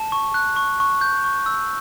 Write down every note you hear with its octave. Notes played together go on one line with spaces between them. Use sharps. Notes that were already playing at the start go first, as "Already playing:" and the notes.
Already playing: A5
C#6
F#6
C#6
C#6
G6
C#6
E6